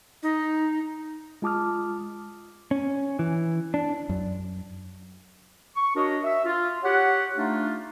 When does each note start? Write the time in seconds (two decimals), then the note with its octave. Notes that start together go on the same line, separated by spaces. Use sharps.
0.23 D#4
1.42 G#3 F4 A5 D6 D#6 F6
2.71 C#4
3.19 E3
3.74 D4
4.09 F#2
5.75 C#6
5.95 D4 F#4 A#4 C#5 D#5
6.24 E5
6.45 F4
6.83 G4 C#5 F#5
7.36 A3 D4 D#4 F4